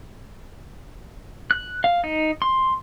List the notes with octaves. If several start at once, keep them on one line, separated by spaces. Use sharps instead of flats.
F#6
F5
D#4
C6